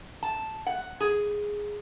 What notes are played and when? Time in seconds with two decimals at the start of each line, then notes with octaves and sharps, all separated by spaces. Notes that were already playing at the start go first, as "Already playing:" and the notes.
0.23 A5
0.66 F#5
1.00 G#4